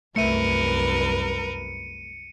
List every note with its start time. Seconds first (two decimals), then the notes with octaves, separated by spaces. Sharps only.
0.16 C2 F#2 A3 A#4 B4 E5 C#7 D#7